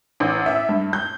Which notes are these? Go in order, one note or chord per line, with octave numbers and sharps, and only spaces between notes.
A1
E5
G2
G6